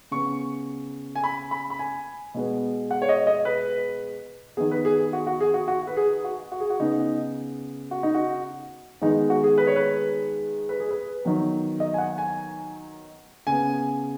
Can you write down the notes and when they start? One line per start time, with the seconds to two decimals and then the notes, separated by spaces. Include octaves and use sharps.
0.11 C#3 B3 C#6
1.15 G#5
1.24 B5
1.51 B5
1.70 B5
1.79 G#5
2.34 B2 G#3 B3
2.91 F#5
3.02 C#5
3.09 D#5
3.27 D#5
3.45 B4
4.57 D#3 B3 G#4
4.71 B4
4.85 G#4
4.99 G#4
5.13 F#4
5.27 F#4
5.41 G#4
5.54 F#4
5.68 F#4
5.87 B4
5.97 G#4
6.24 F#4
6.52 F#4
6.60 G#4
6.70 F#4
6.80 C#3 B3 D#4
7.91 F#4
8.03 D#4
8.14 F#4
9.02 D#3 G#3 B3 D#4
9.30 F#4
9.44 G#4
9.58 B4
9.67 C#5
9.76 B4
10.69 B4
10.80 G#4
10.91 B4
11.25 D#3 F#3 B3
11.80 D#5
11.94 G#5
11.98 F#5
12.18 G#5
13.47 C#3 B3 G#5